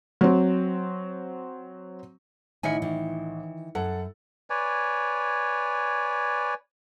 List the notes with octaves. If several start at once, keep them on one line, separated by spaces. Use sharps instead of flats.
F#3 C4
A1 D#3 E4 D#5 G#5 C#7
D#3 E3
F#2 A4 F#5 A5
B4 C#5 D5 G#5